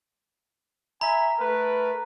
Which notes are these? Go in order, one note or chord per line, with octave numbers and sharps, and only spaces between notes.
E5 G#5 A#5 B5
A3 A#4 B4